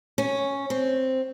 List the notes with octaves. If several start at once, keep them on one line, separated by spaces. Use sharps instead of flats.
C#4
C4